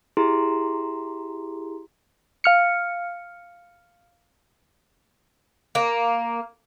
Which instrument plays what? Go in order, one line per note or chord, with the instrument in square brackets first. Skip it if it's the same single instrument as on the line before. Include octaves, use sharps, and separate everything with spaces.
[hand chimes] E4 G4 G#4 A#5 C6
[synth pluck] F5 F6 C#7
[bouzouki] A#3